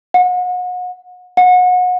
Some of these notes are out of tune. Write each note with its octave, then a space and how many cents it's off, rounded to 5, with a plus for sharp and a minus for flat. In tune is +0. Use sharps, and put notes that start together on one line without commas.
F#5 -35
F#5 -30